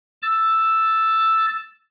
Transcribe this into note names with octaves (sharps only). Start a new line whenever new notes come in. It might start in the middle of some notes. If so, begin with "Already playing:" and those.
E6 A6